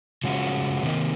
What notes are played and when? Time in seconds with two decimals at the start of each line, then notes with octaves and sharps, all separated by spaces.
0.24 C#3 F3 G#3 C#4 F#4
0.83 C3 D#3 A#3 D#4